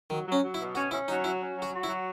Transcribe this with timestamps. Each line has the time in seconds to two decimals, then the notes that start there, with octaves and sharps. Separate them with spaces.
0.10 D#3 F#3
0.27 F#3 C#4
0.43 F#3
0.54 E4
0.60 B2
0.75 C#4 F#4
0.91 C#4 E4
1.08 F#3 D#4
1.24 E4 F#4
1.40 C#4
1.57 F#3
1.62 F#4
1.73 F#4
1.83 E4
1.89 F#3